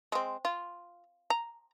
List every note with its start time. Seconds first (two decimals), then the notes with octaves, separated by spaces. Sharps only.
0.12 G#3 C4
0.45 F4
1.30 A#5